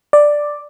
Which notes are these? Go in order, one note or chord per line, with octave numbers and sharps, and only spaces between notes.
D5